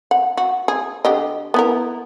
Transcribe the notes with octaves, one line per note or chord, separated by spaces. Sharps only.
F#5
F#4
G#4
D3 G4 D#5
B3 E4 A#4